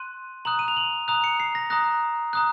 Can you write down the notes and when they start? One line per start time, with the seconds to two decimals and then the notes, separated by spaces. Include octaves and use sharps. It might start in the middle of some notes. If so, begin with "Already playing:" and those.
Already playing: C6 F#6 D#7
0.45 A#5 D#6 F#6 F#7
0.59 D#7
0.68 F7
0.77 F#7
1.08 A#5 D#6 F#6 F7
1.24 C#7
1.40 C7
1.55 A#6
1.70 A#5 D#6 F#6 A#6
2.33 A#5 D#6 F#6